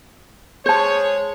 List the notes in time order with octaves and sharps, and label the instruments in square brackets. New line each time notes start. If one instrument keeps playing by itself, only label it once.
[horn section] G#3 G#4 C#5 [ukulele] C5 A5